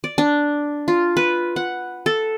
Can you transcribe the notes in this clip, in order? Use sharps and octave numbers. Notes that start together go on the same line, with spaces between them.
D5
D4
F4
B4
F#5
A4